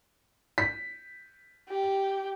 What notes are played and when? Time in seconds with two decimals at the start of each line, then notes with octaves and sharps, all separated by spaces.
0.58 B6
1.69 G4